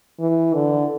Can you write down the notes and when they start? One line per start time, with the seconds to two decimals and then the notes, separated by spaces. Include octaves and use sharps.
0.20 E3
0.54 D3